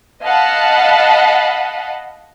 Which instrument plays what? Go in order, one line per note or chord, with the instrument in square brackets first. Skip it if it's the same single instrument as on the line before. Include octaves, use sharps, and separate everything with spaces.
[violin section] D#5 F5 F#5 A5 B5